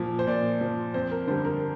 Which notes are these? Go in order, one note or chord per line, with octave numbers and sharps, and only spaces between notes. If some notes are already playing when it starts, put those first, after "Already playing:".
Already playing: A#2 F3
C5
A#2 D5
F3
F2 C5
A#4
D3 G3 C5
A#4